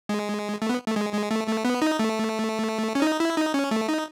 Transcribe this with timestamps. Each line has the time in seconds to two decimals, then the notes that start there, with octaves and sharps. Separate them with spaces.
0.09 G#3
0.62 A3
0.69 B3
0.86 A3
0.96 G#3
1.13 G#3
1.31 A3
1.47 A3
1.65 B3
1.82 D#4
1.99 A3
2.95 C#4
3.02 D#4
3.20 E4
3.36 D#4
3.54 C#4
3.71 A3
3.89 D#4